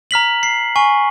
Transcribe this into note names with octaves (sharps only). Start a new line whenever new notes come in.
A#5 F6 B6 F#7
C7
G#5 C#6